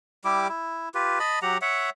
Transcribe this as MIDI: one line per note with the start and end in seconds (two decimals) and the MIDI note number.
0.25 0.48 55
0.25 0.48 64
0.25 0.48 67
0.25 0.48 86
0.49 0.89 64
0.94 1.19 65
0.94 1.19 67
0.94 1.19 71
1.20 1.39 75
1.20 1.39 81
1.20 1.39 83
1.42 1.58 54
1.42 1.58 67
1.42 1.58 78
1.42 1.58 82
1.62 1.90 73
1.62 1.90 76
1.62 1.90 78